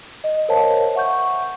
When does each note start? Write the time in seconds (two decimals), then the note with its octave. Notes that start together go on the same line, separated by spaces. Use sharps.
0.24 D#5
0.49 A#4 C5 C#5 D#5 F5 A5
0.94 E5 F#5 C#6 G6